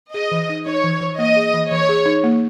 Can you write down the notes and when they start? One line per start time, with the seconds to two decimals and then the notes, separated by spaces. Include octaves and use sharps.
0.14 G#4 D#5
0.31 E3
0.49 D#4
0.66 D#4 C#5
0.84 E3
1.01 E3
1.19 A#3 D#5
1.36 G#4
1.54 E3
1.71 E3 C#5
1.89 G#4
2.06 D#4
2.24 A#3